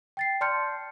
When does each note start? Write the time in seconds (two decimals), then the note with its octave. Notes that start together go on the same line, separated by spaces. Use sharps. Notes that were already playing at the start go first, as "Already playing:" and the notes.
0.17 G5 A6 C7
0.41 D5 A5 C6 F6 G6 C#7